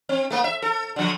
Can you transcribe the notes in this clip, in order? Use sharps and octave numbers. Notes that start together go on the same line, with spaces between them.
C4
A3 A#3
E5
A4
D3 F3